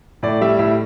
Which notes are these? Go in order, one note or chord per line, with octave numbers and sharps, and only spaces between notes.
A2 D5
G3 E5
A2 E5